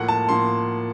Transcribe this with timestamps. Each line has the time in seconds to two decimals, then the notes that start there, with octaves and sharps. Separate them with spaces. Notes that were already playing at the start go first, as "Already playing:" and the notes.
Already playing: A2 F3 A#3 F#5
0.08 A5
0.29 A2 F3 A#3 C6